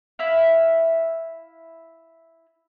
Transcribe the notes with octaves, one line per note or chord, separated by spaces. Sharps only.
E4 E5 F5